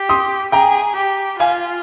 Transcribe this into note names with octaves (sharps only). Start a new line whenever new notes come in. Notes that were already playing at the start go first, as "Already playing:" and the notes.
Already playing: G4
C6 D#6
G#4 G5 A#5
G4
F4 F5 G#5